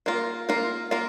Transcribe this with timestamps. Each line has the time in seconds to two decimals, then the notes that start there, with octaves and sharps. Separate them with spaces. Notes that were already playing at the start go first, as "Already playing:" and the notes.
0.06 A#3 F4 A#4
0.49 A#3 F4 A#4
0.91 A#3 F4 A#4